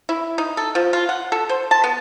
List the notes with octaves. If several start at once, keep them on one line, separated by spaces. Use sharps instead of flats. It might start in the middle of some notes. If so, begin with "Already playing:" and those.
E4
D#4
A4
F3
F4
F#5
A4
C5
A5
B3